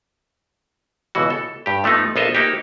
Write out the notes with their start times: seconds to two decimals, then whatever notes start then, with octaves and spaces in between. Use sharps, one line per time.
1.15 C#2 B2 E3 F#4
1.30 A4
1.66 G2 G4
1.84 F3 A3 B3 D#4
2.16 A#1 B3 F4 A4 D#5 E5
2.35 A#3 D#4 F#4 G4